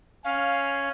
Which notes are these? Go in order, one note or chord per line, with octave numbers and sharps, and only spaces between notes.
C#4 F5